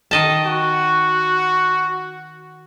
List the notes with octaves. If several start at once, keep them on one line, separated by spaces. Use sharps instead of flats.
D#3 D#5 A5
F#4